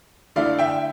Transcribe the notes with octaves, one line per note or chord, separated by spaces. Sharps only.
D3 A3 E4 D5 F5
E5 G5